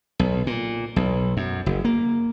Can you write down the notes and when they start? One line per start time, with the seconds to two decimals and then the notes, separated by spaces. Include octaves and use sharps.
0.19 B1
0.47 A#2
0.96 B1
1.37 F#2
1.66 F#1
1.85 A#3